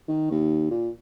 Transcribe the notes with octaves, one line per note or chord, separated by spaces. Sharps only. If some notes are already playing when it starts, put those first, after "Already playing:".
D#3
D#2
A#2